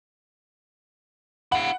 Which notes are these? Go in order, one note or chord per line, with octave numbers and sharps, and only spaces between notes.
E4 F5 F#5